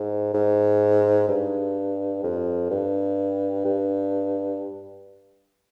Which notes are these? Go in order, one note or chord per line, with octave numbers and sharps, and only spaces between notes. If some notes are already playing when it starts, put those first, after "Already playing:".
Already playing: G#2
G#2
G2
F2
G2
G2